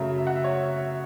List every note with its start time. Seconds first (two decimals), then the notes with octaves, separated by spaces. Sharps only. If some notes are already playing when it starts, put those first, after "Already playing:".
Already playing: F#2 C#3 F#3 A3 E5
0.18 E5
0.27 F#5
0.36 E5
0.44 C#5